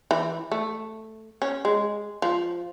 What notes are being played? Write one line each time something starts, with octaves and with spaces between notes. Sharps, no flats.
E3
A3
C#4
G#3
F3